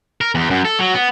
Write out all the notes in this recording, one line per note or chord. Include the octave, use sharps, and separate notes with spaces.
A#4
E2
F#2
A4
F#3
B3